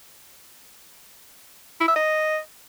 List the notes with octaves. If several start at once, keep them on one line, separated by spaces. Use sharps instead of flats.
E4
E5
D#5